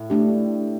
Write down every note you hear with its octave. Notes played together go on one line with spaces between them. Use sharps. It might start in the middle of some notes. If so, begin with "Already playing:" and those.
Already playing: A2
A3 D4 G4